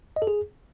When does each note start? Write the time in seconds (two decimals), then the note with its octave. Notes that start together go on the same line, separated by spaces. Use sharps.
0.16 D#5
0.22 A4
0.27 G#4